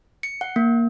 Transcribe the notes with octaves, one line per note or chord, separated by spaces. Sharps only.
C#7
F#5
A#3